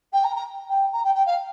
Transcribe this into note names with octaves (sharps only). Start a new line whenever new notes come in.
G5
A#5
A#5
G5
A#5
G5
G5
F5